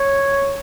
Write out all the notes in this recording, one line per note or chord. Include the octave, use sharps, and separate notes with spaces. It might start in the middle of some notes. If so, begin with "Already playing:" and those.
Already playing: C#5